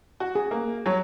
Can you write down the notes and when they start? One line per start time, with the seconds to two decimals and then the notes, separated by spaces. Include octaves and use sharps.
0.20 F#4
0.35 G#4
0.51 A#3
0.86 F#3 C#5